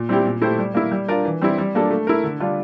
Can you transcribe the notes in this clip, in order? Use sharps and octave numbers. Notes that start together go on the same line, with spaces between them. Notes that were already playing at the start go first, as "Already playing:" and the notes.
Already playing: A#2
G3 C4 E4 G4
A#2
A3 E4 G4 C5
G3
A#3 E4
G3
D4 F4 A#4 D5
E3
G3 C4 E4
G3
A#3 D4 F4 A4
A3
E4 A#4
D3
G3 D4 F4